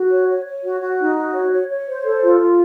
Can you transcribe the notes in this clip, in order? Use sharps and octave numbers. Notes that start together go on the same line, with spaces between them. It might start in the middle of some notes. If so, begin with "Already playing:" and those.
Already playing: F#4
C#5
C#5
C#5
F#4
F#4
D#4
F#4
C#5
C#5
C#5
C5
A4
F4
F4